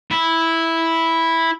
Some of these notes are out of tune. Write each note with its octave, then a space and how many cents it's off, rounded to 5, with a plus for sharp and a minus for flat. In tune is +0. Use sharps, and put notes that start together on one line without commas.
E4 -5